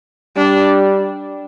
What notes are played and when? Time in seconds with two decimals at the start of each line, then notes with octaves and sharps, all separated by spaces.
0.37 G3 D4